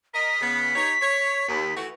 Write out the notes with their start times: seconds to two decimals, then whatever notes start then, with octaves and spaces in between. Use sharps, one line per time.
0.14 A#4 D#5 B6
0.41 C#3 B3
0.75 D#4 G4 C#5
1.01 C#5
1.48 D#2
1.77 E3 A3 F#4